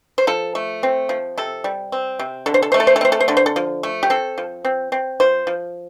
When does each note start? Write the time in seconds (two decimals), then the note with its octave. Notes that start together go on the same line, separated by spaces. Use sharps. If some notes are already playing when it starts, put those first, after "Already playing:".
0.18 C5
0.27 F3 A4
0.55 A3
0.83 C4
1.09 F3
1.38 C3 A4
1.64 G3
1.92 C4
2.19 C3
2.46 D3 A4
2.54 C5
2.63 A4
2.72 A3 C5
2.80 A4
2.87 C5
2.96 A4
3.01 C4 C5
3.12 A4
3.20 C5
3.28 D3 A4
3.37 C5
3.46 A4
3.56 F3
3.83 A3
4.03 G4
4.10 C4 A4
4.38 F3
4.65 C4
4.92 C4
5.20 F3 C5
5.47 F3